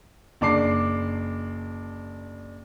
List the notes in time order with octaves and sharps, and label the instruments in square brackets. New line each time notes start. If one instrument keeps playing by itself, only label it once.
[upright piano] F#1 D4 D6 C7